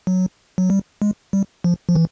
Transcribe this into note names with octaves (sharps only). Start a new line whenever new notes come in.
F#3
F#3
G3
G#3
G3
F3
F3
E3